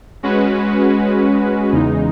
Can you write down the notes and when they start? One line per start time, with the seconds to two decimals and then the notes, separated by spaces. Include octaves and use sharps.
0.23 G#3 C#4 F#4 B4
1.72 E2 C#3 G#3 D#4